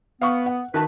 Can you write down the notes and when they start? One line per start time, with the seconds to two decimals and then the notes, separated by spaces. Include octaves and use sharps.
0.22 B3 F5 C#6
0.46 F#5
0.74 D#3 E3 F#4 B4 A5